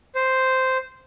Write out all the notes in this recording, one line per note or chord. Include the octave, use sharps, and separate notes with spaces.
C5